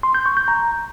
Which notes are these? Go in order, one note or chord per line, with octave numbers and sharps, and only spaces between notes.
C6
G6
C#6
G6
A#5